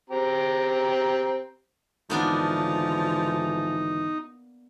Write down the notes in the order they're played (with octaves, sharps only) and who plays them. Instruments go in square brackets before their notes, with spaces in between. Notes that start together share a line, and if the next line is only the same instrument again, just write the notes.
[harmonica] C4 G4 A#5
[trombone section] G#1 D3 E3 [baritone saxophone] F3 [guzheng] A#3 B3 D4 [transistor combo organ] D#4